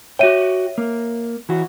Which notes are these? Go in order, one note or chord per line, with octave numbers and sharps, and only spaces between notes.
F#4 C#5 E5 G5 D#7
A#3
E3 F#4